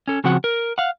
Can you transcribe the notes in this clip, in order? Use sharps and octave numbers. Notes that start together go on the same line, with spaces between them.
C#4 A4
C#3 F3 C4 F#4 F#5
A#4
F5 F#5